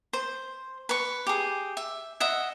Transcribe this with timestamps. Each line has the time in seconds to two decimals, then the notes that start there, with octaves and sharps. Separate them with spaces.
0.13 C5
0.89 B4 C#6
1.27 G4 G#4
1.77 E5
2.20 D#5 E5 F#5